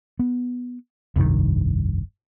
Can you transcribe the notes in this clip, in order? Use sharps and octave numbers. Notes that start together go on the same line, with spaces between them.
B3
F1 C2 G2 D#3